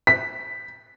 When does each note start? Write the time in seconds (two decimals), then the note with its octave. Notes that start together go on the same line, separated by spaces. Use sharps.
0.07 B6